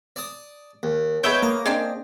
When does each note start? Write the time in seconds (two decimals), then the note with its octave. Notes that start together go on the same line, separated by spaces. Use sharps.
0.16 D5 A5 D#6
0.83 D#2
1.23 G#3 B3 B4 C#5 E5 G6 D7
1.42 A#3 D#5
1.66 G#3 C4 D4